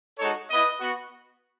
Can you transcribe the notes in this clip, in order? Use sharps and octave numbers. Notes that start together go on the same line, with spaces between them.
G#3 D#4 F#4 A4 C#5
B3 E4 B4 D#5
B3 F#4